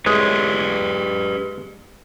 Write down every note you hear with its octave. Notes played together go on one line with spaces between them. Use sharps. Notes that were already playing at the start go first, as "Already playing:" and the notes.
G#3 G4 B4 C#5